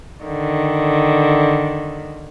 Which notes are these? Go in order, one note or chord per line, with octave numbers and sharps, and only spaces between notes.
D3 D#3